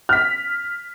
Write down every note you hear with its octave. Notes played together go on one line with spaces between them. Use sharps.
F6 B6